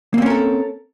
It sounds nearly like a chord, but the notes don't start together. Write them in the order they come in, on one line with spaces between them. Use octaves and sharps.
A#3 C4 C#4 A#4 A4